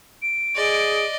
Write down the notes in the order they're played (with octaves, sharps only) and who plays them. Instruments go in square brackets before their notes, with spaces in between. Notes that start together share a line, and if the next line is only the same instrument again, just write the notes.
[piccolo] D7
[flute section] G#4 [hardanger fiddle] D5 D#5